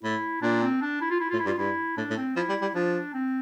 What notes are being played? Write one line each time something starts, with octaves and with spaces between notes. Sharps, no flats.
A2 E4
A#2 D4
C4
D4
E4
F4
E4
A2 F4
E4
G2 F4
G2 E4
A2 D4
A2
C4
F3 E4
G3
G3
F3 D4
C4